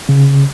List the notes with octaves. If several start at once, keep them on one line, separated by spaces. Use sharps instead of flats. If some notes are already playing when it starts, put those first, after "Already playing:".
C#3